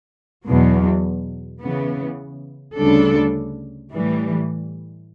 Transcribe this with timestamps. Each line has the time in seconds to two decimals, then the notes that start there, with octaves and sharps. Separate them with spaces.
0.45 E2 B2 F#3
1.61 C#3 E3 B3
2.76 D2 C#3 G3 D4 A4
3.92 A2 E3 G3